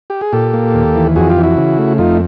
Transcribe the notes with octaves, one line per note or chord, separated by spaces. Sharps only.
G4
G#4
A#2 G4 A4
A#3
D#2
E3
F2 F#4 G#4
F4 G4
E3
E4 F#4
C#3
A3
F2 D#4 F4